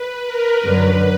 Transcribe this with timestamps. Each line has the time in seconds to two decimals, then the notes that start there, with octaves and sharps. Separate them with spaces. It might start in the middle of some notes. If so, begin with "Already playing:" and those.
Already playing: B4
0.24 A#4
0.63 F#2 D3 F#3 B4